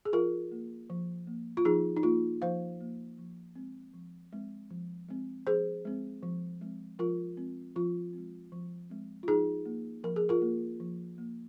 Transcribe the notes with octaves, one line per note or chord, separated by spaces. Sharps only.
G#4
F3 F4 A#4
A#3
F3
A#3
F4
F3 D#4 G#4
D#4
A#3 F4
F3 C5 F5
A#3
F3
G#3 C4
F3
G#3 C4
F3
G#3 C4
F3 G#4 C5
G#3 C4
F3
G#3 C4
F3 F4 A#4
G#3 C4
F3 F4
G#3 C4
F3
G#3 C4
F4
F3 D#4 G#4
A#3
F3 A#4
G#4
F4 A#4
A#3
F3
A#3